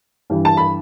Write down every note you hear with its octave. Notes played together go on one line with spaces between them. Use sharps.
G2 E3 G3
A5
B5